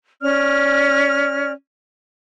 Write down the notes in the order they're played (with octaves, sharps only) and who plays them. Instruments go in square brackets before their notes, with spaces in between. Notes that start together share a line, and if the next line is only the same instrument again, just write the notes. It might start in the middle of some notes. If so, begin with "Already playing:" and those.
[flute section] C#4 D5 F6